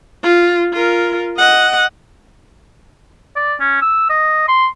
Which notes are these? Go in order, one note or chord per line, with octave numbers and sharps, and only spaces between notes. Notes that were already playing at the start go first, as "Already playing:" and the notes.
F4
F4 A#4
D#5 F#5
D5
C#4
E6
D#5
C6